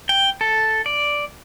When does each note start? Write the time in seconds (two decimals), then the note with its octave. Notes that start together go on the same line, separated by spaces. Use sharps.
0.09 G5
0.41 A4
0.86 D5